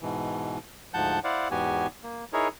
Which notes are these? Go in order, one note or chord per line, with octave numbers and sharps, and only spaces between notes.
G#2 B2 E3
D2 G#2 F3 F#5 A5 G6
E4 C5 D5 F5 F#5
E2 G#2 B3 F#4 G4 G#5
A#3
D#4 E4 G#4 A#4 C#5